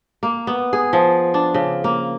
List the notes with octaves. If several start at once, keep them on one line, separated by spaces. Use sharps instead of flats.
A#3
B3
G#4
F3
D4
C#3
A#3